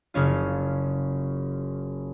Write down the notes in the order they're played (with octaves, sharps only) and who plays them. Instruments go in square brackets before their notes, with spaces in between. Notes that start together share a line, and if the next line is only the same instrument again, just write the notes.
[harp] F#1 C#3 C#4 F4